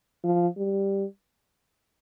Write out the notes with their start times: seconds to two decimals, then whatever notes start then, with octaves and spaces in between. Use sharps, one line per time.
0.24 F3
0.57 G3